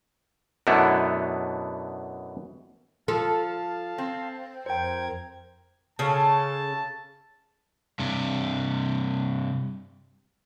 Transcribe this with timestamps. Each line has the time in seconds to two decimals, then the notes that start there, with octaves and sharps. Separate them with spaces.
0.67 F#2 B2 A3 B3 D4 E4
3.08 F3 A4 F5 A5
3.98 C4
4.66 F2 A#4 C5 G5 G#6
5.99 C#3 C#4 A4 A5
7.99 G2 C3